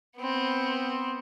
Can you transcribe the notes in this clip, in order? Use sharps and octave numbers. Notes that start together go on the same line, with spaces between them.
B3 C4